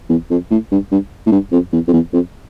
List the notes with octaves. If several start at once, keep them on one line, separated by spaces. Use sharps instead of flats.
E2
F2
A2
G2
G2
A2
G2
F2
E2
F2
E2
F2